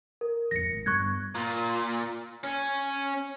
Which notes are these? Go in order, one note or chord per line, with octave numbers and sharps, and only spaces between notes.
A#4
E1 A1 F2 A#6 C#7
G#1
G2 G3 B3 C#6 F#6 G#6
A#2
C#4